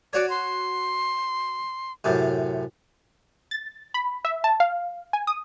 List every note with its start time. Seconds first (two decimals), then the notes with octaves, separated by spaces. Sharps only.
0.13 F#4 C#5 D5
0.30 C6
2.04 F#2 A2 C3
3.51 A6
3.94 B5
4.25 E5
4.44 A5
4.60 F5
5.13 G#5
5.27 D#6